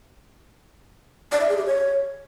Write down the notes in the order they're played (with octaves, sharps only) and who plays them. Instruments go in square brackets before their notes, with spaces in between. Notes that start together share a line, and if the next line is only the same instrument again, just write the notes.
[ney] D5
E5
G#4
G4
C#5